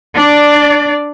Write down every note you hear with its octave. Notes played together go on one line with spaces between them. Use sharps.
D4 D5